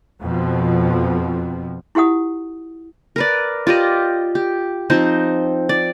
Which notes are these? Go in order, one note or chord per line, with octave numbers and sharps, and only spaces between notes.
F2 B2 F3
E4 F4 G4 F#5 D#6
A#4 B4 D5
F4 G4 D5 D#5
G4
F3 C4 D#4 C5
D5